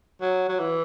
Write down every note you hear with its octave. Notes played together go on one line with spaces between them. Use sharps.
F#3
F#3
E3